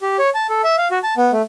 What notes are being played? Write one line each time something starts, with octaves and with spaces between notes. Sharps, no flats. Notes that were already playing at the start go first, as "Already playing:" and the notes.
G4
C#5
A5
A4
E5
F5
F#4
A5
B3
A3